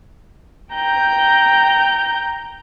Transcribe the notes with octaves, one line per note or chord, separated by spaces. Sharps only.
G5 A#5 G6